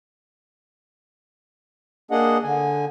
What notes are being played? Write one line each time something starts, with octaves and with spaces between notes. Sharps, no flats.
A#3 D4 G#4 D#5 F#5
D3 G#5